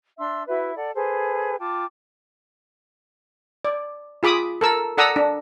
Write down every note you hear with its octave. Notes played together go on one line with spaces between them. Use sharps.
D4 E5 C6 E6
E4 F#4 B4 E5
A4 D5 F#5
G#4 A4 B4 C5
F4 G5 A5 D6
D5
F4 G#4 B5 D6 D#6
A4 A#4 E6
A4 D5 F#5 A#5 D#6 E6
D4